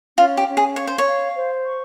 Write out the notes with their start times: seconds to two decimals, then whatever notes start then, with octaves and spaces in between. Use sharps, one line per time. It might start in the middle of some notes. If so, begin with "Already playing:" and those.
0.18 C#4 F4
0.37 G4
0.47 C#4
0.57 G#4
0.76 C#5 F5
0.87 C5
0.98 C#5
1.06 F5
1.36 C5
1.65 C#6